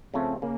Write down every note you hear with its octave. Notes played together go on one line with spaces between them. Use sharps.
C#3 F3 A3 C4
C#3 A#3